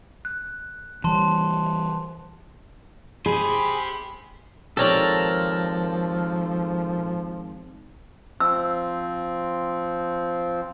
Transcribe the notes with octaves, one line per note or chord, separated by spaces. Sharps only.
F#6
E3 G3 A5 C6
G4 G#4 C5 B5
G#1 F3 G4 A4 A#4 C#5 D5
F3 C4 E6